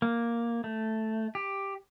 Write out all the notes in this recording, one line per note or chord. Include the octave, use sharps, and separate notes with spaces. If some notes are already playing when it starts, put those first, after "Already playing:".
A#3
A3
G4